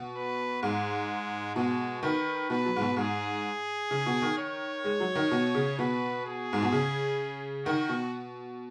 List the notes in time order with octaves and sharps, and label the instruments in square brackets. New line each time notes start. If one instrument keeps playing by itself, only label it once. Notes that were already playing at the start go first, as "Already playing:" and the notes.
Already playing: [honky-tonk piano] B2
[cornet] B4
[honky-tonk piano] G#2 [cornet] G#3
[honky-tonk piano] B2 [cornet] G#3
[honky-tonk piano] D#3 [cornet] B4
[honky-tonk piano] B2 [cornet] B4
[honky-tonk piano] F#3
G#2
B2
[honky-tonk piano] G#2 [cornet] G#4
[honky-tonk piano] C#3
B2
D#3
[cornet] C#5
[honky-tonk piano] G#3
F#3
D#3
B2
C#3
[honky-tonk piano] B2 [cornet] B4
[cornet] G#4
[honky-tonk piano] G#2
B2
C#3
[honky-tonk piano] D#3 [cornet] F#4
[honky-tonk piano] B2